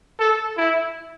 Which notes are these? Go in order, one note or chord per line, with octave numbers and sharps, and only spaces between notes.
A4
E4